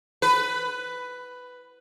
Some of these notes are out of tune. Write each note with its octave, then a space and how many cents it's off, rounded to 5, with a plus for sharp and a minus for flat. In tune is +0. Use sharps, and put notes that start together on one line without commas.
B4 +10